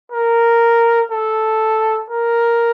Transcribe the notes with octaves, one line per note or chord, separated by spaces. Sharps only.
A#4
A4
A#4